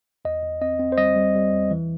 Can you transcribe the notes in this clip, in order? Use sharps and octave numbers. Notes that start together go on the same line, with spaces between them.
E2 D#5
E2
C4 D#5
C4
C5
G3 D#5
G3
G3
E2
E3